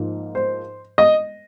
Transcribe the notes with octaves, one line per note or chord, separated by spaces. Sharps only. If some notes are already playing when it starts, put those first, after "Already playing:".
Already playing: G#2 F3 A#3
C5
D#5